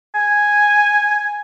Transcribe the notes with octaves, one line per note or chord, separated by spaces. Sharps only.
G#5